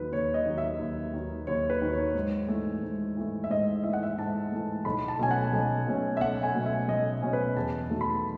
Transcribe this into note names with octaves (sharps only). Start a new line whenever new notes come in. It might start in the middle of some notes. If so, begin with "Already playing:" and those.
Already playing: D#2 D#3 F#3 B4
D#2 C#5
D#5
D#3 F#3
E5
D#2
D#3 F#3
D#2 C#5
B4
D#3 F#3
C#5
G#2
E3 A3
G#2
E3 A3
E5
G#2 D#5
E3 A3 E5
F#5
E5
G#2 A5
E3 A3
B1 B5
A5
B2 A3 C#4 G#5
F#5
B1
B2 A3 C#4
E5
B1 F#5
G#5
B2 A3 C#4
E5
B1 D#5
B2 A3 C#4
B4
E2 A5
D#3 F#3 A3
B5